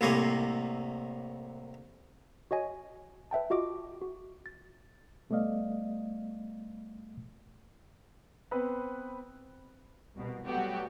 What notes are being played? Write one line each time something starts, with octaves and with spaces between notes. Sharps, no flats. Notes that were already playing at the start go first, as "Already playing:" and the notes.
C2 A2 C3 A#3 F5 G#5
F#4 C#5 D#5 G#5
B4 E5 G5 A5
F4 F#4 D#5 D6
F#4
A6
G3 A3 B3 D5 D#5 F5
B3 C4 B4
C2 B2
F#3 G3 A3 B3 F#4 G4